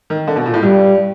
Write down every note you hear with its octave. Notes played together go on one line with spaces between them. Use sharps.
D#3
D3
B2
A#2
A2
G2 G3